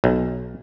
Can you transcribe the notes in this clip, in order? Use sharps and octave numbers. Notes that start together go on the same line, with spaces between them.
B1